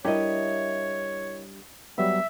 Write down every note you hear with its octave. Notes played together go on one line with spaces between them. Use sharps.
G3 D4 E4 G4 A#4 C#5 D#5
F#3 G3 B3 E5